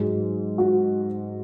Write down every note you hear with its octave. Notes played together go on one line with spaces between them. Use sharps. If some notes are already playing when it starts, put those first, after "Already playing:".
Already playing: G#2 F#3 G#4
F#4